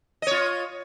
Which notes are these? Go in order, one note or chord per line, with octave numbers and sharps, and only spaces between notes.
F4 C#5 D#5